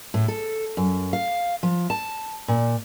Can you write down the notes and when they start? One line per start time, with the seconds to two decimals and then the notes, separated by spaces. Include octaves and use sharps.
0.14 A2
0.28 A4
0.77 F#2
1.13 F5
1.63 F3
1.90 A5
2.48 A#2